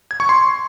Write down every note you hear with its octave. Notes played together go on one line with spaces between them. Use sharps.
G#6
C#6
C6